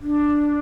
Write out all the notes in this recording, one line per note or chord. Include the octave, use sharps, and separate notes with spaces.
D4